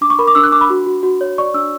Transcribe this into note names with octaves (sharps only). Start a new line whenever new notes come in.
D4 D6
C#6
A#4 B5
D6
D4 E6
F#6
D4 D6
B5
F#4
F#4
F#4
C#5
D5 C#6
D4 E6